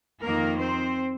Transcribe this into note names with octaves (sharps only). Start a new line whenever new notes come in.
F2 D#3 A#3 A#4
C4 C5